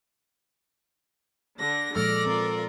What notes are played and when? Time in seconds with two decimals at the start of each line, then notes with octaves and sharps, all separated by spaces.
1.60 D3 A#6
1.96 A#2 F3 G#3 A4 D5 F6 A#6
2.26 C4 F4 A#4